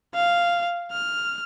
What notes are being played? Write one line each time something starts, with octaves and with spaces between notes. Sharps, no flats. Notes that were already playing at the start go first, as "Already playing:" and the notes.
F5
F6